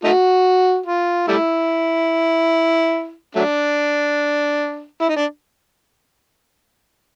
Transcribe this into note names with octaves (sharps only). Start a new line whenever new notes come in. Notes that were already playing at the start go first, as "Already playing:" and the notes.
A3 D#4 F#4
F4
G3 A3 E4
F#3 A3 D4
E4
D#4
D4